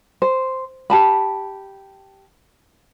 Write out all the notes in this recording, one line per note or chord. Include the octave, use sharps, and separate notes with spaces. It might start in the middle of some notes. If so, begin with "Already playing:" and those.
C5
G4 A5 B5